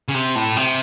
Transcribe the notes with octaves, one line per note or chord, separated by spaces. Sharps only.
C#3
C3
A2
C3